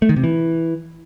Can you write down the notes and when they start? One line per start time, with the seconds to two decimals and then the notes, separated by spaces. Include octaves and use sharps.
0.02 A3
0.09 D#3
0.16 C3
0.24 E3